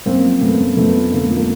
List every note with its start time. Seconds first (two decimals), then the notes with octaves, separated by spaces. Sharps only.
0.06 F#2 A#3 C4
0.24 F3
0.41 F#2 A3 B3
0.59 F#2
0.77 F2 A3 B3
0.95 F3
1.12 D3 A#3
1.25 A3
1.31 F3
1.36 G#3 A#3